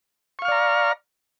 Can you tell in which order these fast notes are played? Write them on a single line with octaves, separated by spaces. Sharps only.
C#6 F5 F6 D5 A#5